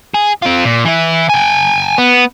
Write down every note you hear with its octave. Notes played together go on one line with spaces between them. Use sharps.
G#4
C4 F4
A#2
E3 E4
G5 G#5
B3